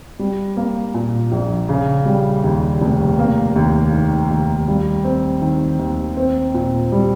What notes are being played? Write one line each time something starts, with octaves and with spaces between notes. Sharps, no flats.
G3
A#3
A#2
A#1
C#3
G3
D#2
F1
A#3
D#2
D#3
D#2
G3
C4
D#3
D#2
C4
A#2
G3